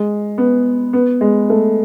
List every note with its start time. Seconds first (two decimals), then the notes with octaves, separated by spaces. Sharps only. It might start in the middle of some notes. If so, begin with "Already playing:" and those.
Already playing: G#3
0.38 B3
0.93 B3
1.21 G#3
1.50 A3